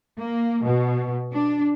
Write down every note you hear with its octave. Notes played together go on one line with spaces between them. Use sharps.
A#3
B2
D4